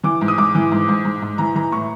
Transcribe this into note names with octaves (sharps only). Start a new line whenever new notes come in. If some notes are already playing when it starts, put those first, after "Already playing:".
E3 D6
G#2
D#6
G#2 D6
E3
G#2
G#2
G#2
G#2
E3 A#5
E3 A#5
A2 C#6